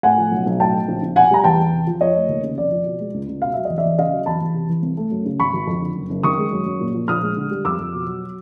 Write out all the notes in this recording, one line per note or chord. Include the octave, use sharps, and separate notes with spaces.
A2 F#5 G#5
F3
B1
B1
A2 G5 A5
F#3
A#1
A#1
B2 F#5 G#5
G3 A#5
E2 G5 A5
E2
C3
F3
F2 C#5 D#5
A3
D#2
C#3
F1 D5
F3
B2
G#3
C#2
C#2
B2 F5
F#3 E5
E2 D#5
D5 E5
E2
C#3 D#5 F5
F#3
E2 A5 B5
E2
C3
E3
C2
A3
F#2
C#3
G#1 B5 C#6
G#1
F2
D3
F#1
F#1
D#3 C#6 D#6
G#3
F#2
F#2
A#2
F3
A#1 D#6 F6
G#3
D3
G3
F2 D6 E6
F2
B2
F#3